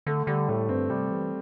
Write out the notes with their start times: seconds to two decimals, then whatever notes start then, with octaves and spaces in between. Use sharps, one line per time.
0.07 D3 A3
0.27 D3 G3
0.49 A2 A3
0.69 G2 C4
0.90 C3 G3
1.10 E3